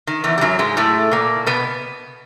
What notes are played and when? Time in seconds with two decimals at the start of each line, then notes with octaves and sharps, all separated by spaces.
0.07 D#3
0.24 E2 E3
0.38 G3
0.41 F#2 F#3
0.59 G#2 G#3
0.77 A2 A3
1.11 A#2 A#3
1.46 B2 B3